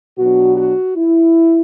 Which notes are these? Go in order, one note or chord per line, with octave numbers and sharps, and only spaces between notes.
B2 F#3 B3 D4 F#4
F#4
E4